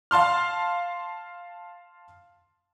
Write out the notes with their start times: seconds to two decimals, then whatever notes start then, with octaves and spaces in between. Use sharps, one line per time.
0.11 F5 A5 C6 F6